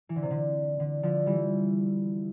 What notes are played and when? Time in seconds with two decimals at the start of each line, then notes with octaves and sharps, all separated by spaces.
0.09 E3
0.16 D3
0.22 C3
0.30 D3
0.80 D3
1.03 D3 F3
1.26 E3 G3